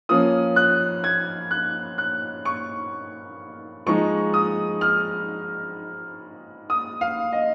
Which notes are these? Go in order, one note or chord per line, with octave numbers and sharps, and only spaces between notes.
F3 A#3 C#4 D#6
F#6
G#6
F#6
F#6
C#6
F3 G#3 D#4 C#6
D#6
F6
D#6
F5
D#5